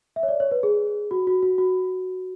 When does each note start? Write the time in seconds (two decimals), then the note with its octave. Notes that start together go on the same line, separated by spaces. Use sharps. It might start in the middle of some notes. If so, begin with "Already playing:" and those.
0.16 E5
0.23 C#5
0.28 D5
0.40 C#5
0.51 B4
0.63 G#4
1.11 F#4
1.27 F#4
1.43 F#4
1.58 F#4